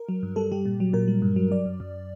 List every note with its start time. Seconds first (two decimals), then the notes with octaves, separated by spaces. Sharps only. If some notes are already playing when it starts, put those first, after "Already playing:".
Already playing: A#4
0.09 F#3
0.23 G2
0.36 G3 A4
0.52 G3 G4
0.65 A#2
0.80 F#3
0.93 A#2 A#4
1.08 G3
1.22 G2
1.36 F#3
1.51 F#3 D5
1.65 F#2
1.80 F#2